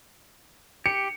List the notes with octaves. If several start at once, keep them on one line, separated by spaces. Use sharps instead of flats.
G4 C#7